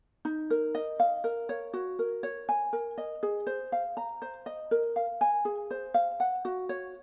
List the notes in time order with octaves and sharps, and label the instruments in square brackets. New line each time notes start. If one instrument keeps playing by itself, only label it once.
[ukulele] D#4
A#4
D#5
F5
A#4
C#5
F#4
A#4
C#5
G#5
A#4
D#5
G#4
C5
F5
A#5
C5
D#5
A#4
F5
G#5
G#4
C5
F5
F#5
F#4
C#5